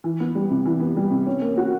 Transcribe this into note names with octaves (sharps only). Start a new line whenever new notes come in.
E3
B3
G3
C3
E3
B3
G3
C3
C#4
A#3
F#4